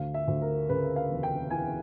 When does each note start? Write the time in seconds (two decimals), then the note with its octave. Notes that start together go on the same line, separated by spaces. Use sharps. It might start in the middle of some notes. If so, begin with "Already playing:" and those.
Already playing: D2 F5
0.14 E5
0.28 D2
0.41 A#4
0.69 C#3 B4
0.96 F5
1.10 E1
1.23 G5
1.50 E3 G#5